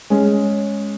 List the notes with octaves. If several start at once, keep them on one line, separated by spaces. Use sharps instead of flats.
G#3 C#4